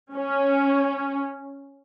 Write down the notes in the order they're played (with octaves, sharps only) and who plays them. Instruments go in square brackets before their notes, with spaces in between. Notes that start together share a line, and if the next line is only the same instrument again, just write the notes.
[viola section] C#4